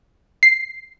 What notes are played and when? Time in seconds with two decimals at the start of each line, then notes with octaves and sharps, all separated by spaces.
0.43 C7